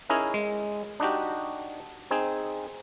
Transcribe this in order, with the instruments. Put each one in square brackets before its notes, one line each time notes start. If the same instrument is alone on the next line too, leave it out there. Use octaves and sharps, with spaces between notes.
[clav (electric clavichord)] C#4 D#4 E4 G#4 A#4
G#3
D4 D#4 F#4 G4
C4 D#4 G#4